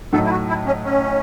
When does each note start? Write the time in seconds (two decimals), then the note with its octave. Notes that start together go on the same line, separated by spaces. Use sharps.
0.13 A2 F#3 A3 D#4 A4
0.24 E4
0.31 F#4
0.48 E4
0.66 C#4
0.85 C#4